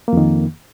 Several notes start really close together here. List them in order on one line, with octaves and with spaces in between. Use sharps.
A#3 F2 D#3